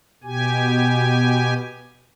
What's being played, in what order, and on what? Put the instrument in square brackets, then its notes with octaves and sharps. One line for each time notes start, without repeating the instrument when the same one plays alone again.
[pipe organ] B2 G4 G#5